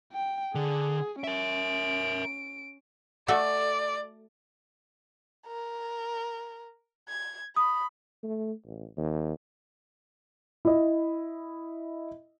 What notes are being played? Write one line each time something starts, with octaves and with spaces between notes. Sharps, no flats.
G5
D3 G#4
C#4 A#4 E5 D7
A3 F#4 A4 D5
A#4
G#6
B5 D#6
A3
A1
D#2
E4 D#5